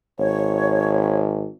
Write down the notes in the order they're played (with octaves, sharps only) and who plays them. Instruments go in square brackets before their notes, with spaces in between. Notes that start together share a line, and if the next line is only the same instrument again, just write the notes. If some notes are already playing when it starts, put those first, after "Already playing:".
[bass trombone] G#1 [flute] C#5